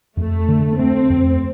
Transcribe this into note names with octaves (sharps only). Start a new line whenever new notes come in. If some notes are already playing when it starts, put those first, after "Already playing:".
F2 A3
D3
A3 C4
F2